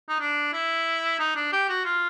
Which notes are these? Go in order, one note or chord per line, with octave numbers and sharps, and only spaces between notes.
D#4
D4
E4
D#4
D4
G4
F#4
F4